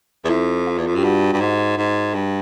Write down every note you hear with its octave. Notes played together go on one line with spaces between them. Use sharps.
E2
F2 E4
F4
E2
F2
F#2 G4
G2 F#4
G2
G#2
G#2
G2